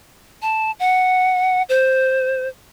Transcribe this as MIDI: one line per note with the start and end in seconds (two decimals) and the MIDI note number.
0.42 0.71 81
0.80 1.62 78
1.69 2.48 72